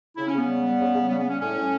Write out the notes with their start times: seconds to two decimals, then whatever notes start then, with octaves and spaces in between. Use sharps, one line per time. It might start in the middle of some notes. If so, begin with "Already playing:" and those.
0.17 C#3 E4
0.27 C#4
0.33 C#3 B3
0.48 G3
0.62 G3
0.79 C#3
0.94 C#3
1.09 G3 B3
1.19 G3 B3
1.29 C#4
1.40 A2 C#4
1.55 A2